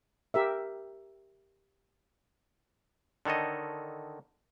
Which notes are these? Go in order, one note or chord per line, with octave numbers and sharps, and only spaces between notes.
G4 A#4 E5
D3 D#3 A4 C#5 D#5